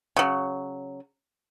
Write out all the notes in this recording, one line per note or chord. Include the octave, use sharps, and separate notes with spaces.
C#3 F#3